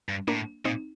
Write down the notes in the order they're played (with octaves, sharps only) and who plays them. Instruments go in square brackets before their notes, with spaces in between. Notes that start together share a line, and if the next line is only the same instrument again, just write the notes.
[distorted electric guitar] G2
[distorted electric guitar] A2 [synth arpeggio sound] A#3 D4
[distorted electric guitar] A#2 [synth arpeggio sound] C4 D#4